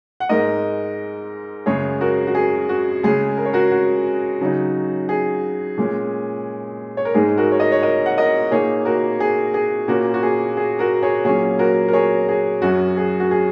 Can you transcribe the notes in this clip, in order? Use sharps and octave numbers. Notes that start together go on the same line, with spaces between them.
F#5
G#2 G#3 D#4 A#4 D#5
F#2 C#3 G#3 G#4 C#5
F#4 A#4
F#4
G#4
F#4
C#3 G#3 C#4 G#4
A#4
C#5
F#4 A#4
F#4
C#3 F#3 D#4
G#4
A#2 G#3 C#4
C#5
A#4
G#2 G#3 D#4 G#4
F#4 A#4
C#5
A#4 D#5
C#5
A#4 D#5
F#5
A#4 D#5
A#2 A#3 D#4 G#4 C#5
F#4 A#4
G#4
G#4
A#2 A#3 C#4 F#4 A#4
F#4
G#4
G#4
F#4 A#4
G#4 C#5
A#2 F#3 A#3 C#4 G#4 C#5
F#4 A#4
A#4
G#4 C#5
G#4
F#2 F#3 C#4 F#4
G#4
F#4
G#4